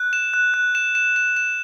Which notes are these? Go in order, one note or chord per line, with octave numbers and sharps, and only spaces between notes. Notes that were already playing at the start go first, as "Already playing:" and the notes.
Already playing: F#6
E7
F#6
F#6
E7
E7
E7
E7